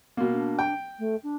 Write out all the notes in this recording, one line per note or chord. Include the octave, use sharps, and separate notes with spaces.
B2 A#3
D4
G5
A3
D4